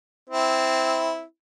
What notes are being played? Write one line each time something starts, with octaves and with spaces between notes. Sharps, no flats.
C4 E4